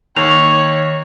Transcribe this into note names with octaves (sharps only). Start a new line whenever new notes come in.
D#2 D#3 C#5 F7